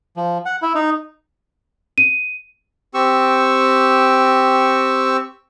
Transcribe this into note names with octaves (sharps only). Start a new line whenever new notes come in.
F3
F#5
E4
D#4
D#7
C4 G4 C#6 E6